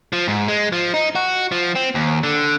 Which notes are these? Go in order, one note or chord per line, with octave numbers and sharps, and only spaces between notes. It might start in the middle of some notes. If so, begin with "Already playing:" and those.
F3
G#2
G#3
F3
D#4
F#4
F3
C4
D#2
D3